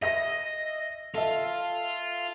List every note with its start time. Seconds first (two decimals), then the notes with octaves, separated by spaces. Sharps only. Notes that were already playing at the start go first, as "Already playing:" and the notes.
0.02 D#5 E5 A#6
1.14 F4 A4 E5